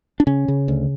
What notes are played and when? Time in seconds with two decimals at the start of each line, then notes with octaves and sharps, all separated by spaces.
0.20 D4
0.27 C#3 C#4
0.48 C#3
0.68 D2